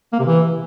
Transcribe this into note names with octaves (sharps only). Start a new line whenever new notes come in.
A#3
C3
E3